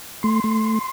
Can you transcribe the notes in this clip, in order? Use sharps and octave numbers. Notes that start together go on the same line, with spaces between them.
A3 C6
A3